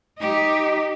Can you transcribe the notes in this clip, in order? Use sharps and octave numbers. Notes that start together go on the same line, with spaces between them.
D#4 G4